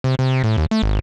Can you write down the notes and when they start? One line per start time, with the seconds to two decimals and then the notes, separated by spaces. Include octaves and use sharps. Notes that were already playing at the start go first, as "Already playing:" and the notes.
0.04 C3
0.19 C3
0.44 A2
0.58 D#2
0.71 A3
0.83 G#1